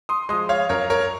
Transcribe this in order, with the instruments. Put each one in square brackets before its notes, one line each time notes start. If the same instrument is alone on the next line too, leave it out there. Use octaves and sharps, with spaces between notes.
[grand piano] C6 D#6
F3 G#3 C6 D#6
C#5 F5
F#2 A#4 C#5
A#4 C#5